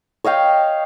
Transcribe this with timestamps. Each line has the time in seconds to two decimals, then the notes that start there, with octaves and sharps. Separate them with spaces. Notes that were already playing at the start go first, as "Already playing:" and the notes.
0.24 C#5 D#5 F5 G5